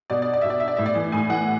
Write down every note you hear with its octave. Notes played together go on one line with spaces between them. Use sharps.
B2 D5
D5
D5
B2 E5
D5
E5
D5
A2 E5
D5
E3
A2 G#5
E3 F#5